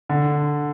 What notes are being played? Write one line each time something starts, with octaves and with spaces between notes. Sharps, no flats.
D3